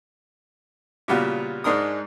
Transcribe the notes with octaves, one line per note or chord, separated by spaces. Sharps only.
A#2 C#3 G3 B3 F4 F#4
G#2 G#3 D4 D#4 A#4 D#6